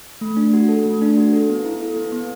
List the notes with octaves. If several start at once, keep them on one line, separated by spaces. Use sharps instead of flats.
A3
D4
F#4
A4
A3
D4
F#4
A4
B3
E4
A4
B3
B3